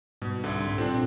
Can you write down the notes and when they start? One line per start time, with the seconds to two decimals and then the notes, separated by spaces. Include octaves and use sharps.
0.22 G#2 B2 G3
0.43 C2 D3
0.78 A#2 C4 D4 F4 A4